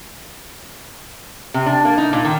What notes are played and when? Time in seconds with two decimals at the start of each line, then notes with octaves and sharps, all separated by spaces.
1.54 C3
1.66 D4
1.85 A#3
1.98 D#4
2.13 A#2
2.25 D#3